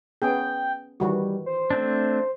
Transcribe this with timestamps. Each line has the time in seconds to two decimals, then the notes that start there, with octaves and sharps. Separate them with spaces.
0.22 B3 C#4 G#4 G5
1.00 D#3 E3 G3 F#4
1.46 C5
1.71 A3 C4 D4